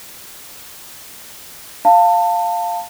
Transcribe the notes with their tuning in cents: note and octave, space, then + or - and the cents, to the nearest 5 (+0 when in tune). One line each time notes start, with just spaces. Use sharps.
F5 +0 A5 +25